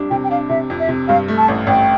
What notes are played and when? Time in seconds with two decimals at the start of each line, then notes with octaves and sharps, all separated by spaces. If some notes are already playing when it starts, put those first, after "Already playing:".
Already playing: F2 C3 G3 D4
0.10 C3 G5
0.24 G5
0.31 D4 F5
0.49 C3 E5
0.70 F2
0.80 E5
0.88 C3
1.08 G2 F5
1.28 A3
1.38 A5
1.48 A1
1.67 A1 G5